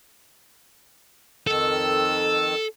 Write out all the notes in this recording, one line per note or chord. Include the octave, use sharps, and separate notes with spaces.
F2 D#3 A4 E6